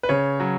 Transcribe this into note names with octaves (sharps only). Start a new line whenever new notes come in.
B4
C#3 C#5
F#3